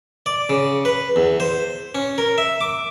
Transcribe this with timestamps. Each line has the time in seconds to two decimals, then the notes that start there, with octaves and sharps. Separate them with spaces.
0.26 D5
0.49 C#3
0.85 B4
1.16 E2
1.40 C5
1.95 C#4
2.18 A#4
2.38 E5
2.61 D6